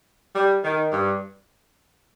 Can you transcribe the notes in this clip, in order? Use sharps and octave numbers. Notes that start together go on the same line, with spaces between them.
G3
D#3
G2